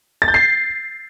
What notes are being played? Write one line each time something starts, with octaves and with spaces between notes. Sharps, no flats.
A6
G6
C7